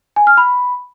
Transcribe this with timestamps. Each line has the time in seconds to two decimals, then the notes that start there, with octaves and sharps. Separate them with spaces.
0.16 G#5
0.27 F6
0.37 B5